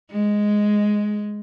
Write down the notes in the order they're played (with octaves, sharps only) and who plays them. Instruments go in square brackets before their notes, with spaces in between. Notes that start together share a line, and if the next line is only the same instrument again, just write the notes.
[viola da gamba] G#3